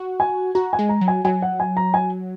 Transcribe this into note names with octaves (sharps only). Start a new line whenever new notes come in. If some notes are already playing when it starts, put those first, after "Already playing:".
Already playing: F#4
G#5
F#4 A#5
G#5
G#3
A#5
F#3
G#5
F#3 G#5
F#5
G#5
A#5
G#5